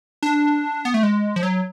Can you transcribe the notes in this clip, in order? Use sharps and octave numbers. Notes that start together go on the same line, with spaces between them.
D4
B3
A3
G#3
F3
F#3